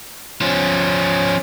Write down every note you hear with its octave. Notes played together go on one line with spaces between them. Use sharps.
F3 C#4